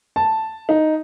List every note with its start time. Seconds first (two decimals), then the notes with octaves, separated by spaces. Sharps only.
0.16 A5
0.69 D#4